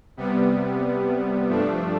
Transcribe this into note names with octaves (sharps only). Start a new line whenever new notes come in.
C3 G3 B3
G2 F3 A3 D4